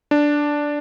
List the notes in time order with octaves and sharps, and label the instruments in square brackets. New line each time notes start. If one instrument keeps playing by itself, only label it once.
[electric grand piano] D4